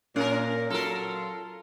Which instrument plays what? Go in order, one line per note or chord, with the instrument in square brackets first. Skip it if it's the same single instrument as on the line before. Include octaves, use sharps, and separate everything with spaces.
[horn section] A#2 [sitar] C#4 A#4
[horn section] F#3 F4 [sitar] A4 A#4